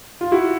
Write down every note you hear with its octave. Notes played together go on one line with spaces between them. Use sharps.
F4
E4 F#4